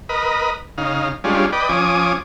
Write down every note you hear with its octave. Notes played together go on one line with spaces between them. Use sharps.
A#4 B4 D#5
C#3 D#4 F5
G3 G#3 C#4 D4 F4
B4 D5 D#5 G5
F3 C#4 G#5 D6 D#6